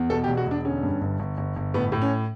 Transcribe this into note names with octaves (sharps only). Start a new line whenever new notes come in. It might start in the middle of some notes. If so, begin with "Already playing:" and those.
Already playing: E2
B2 A4
G4
E1
F#4
E1 D4
D3 C#4
G2
G1
G1
G1
G1
A2 B3
A2
C#4